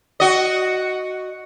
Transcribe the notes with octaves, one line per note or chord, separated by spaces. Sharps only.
F#4 D#5